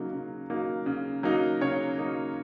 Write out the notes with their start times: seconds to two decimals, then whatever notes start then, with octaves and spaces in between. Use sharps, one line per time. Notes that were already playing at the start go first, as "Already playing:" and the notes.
Already playing: C#3 F#3 A#3 D#4
0.13 C#3
0.50 F#3 A#3 D#4
0.86 C#3
1.23 F#3 A#3 D#4
1.61 C#3 C#5
1.98 F#3 A#3 D#4